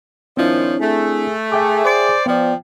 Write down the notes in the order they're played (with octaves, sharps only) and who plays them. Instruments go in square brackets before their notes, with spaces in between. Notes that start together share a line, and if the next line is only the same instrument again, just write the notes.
[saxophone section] A#2 D#3 F3 [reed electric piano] C4 D4 E4 [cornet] C#5
[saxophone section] A3 [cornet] G#4
[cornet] G#4 [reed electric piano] E5 G5 D6
[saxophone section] C5 D5
[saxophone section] F3 [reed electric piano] B3 D5 [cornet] G5